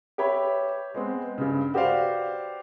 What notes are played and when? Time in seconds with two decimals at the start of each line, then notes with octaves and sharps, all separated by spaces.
0.18 G4 B4 C#5 E5 B5
0.94 G#3 B3 C4
1.38 G2 C#3
1.74 F#4 G4 B4 C5 D5 F5